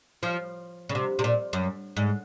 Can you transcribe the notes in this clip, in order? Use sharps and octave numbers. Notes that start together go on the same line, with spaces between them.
F3
C#3
C3
C3
A#2
F#2
G#2